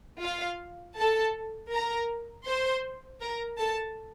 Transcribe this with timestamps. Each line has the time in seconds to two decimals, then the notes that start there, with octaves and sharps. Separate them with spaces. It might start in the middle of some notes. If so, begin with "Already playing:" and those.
0.22 F4 F5
0.97 A4 A5
1.71 A#4 A#5
2.46 C5 C6
3.21 A#4 A#5
3.58 A4 A5